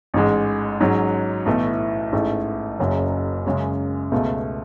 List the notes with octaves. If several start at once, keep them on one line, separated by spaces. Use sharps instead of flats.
A1 G#2 G#3
G#2 F#3 C#4
B1 A2 E3 A3
A1 G#2 E3 A3
F#1 F#2 C#3 F#3
F#2 C#3 G#3 C#4
C#2 B2 A3